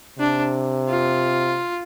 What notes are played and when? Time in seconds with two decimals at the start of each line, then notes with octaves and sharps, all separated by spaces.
0.18 C3 D4
0.89 F4